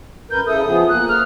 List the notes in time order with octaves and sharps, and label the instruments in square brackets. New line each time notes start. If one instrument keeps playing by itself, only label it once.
[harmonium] F#2 A#4 B4 [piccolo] G6
[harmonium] C#3 E4 A4 [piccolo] D#6
[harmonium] F3 B3 G#4
[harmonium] A#3 [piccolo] F#6
[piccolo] F6